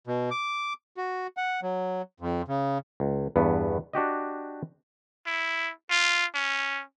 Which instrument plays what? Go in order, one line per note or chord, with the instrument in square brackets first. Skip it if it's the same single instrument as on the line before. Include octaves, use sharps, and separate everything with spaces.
[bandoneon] B2
D6
F#4
F#5
F#3
F2
C#3
[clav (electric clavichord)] C#2
E2 G2 B3
D4 F#4 G4 D#5
[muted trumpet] E4
F4
C#4